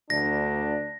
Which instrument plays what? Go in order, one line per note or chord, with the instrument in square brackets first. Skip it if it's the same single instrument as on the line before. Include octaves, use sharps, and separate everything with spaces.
[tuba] D2 [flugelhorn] D4 [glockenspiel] A#6